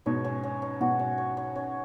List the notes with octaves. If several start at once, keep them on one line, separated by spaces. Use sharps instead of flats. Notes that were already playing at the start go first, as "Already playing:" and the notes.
G#2 B2 C#5
C#4
C#4
C#4
G#2 B2 F#4
C#4
C#5
C#4
C#4